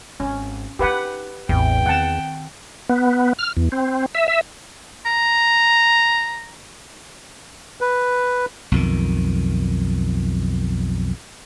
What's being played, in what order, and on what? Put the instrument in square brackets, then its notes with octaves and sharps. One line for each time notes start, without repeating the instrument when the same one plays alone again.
[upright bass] G#1 [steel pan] C#4
[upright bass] D#4 E4 [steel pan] G4 B4 F#5
[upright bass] A1 C4 [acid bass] E2 [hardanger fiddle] G5
[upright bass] D#3 C4 [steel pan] F#5 A5
[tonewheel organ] B3
F6
E2
C4
E5
E5
[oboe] A#5
[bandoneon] B4
[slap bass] B1 F2 D#3